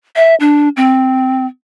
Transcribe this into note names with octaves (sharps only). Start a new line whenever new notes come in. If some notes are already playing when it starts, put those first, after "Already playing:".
E5
D4
C4